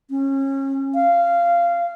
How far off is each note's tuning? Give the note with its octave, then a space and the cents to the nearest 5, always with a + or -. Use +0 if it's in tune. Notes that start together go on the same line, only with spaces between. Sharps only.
C#4 -25
F5 -15